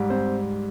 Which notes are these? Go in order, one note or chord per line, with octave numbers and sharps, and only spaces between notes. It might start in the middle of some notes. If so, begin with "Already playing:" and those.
Already playing: G#2 G3
C4 C5